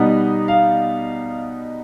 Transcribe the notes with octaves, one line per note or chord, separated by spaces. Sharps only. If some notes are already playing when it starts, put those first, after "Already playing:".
Already playing: B2 G3 B3 D#4 F#5
F5